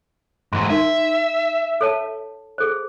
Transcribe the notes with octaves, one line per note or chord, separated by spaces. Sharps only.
G#2 E3 C6
D#4 A#4 E5 C6
A4 C#5 A5
G#4 A4 C5